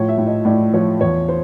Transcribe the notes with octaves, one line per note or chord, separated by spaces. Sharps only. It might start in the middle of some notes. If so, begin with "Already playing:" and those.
Already playing: A2 F3 C#5
E5
A2
D#5
A2 D5
F3 C#5
E2 C#5
C5